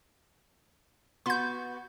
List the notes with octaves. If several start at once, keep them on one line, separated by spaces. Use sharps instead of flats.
B3 F#4 C6 G6